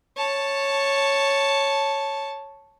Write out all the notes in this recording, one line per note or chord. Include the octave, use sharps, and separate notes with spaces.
C#5 A5